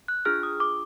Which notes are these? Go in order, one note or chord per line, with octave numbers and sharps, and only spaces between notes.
F#6
D4 F4 G#4 F6
D#6
D6